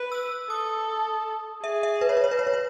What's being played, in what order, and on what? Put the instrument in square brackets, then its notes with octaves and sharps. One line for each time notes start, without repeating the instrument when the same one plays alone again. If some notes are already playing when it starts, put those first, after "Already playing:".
Already playing: [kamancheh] B4
[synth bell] E6
[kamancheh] A4 [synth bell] D#6
[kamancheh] G#4 [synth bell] E5
[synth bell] E5
B4
C#5
B4
C#5
B4
C#5
B4
C#5